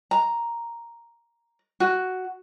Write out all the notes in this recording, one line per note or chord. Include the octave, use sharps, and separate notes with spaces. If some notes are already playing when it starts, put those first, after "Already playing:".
A#5
F#4